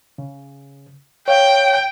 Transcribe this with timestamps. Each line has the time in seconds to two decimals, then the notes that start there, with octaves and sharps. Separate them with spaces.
0.18 C#3
1.28 C#5 F5 G5